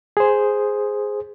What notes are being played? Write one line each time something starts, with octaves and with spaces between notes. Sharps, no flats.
G#4 C5